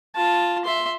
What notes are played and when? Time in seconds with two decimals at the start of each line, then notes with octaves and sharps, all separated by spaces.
0.15 F4 A5
0.65 E5 C6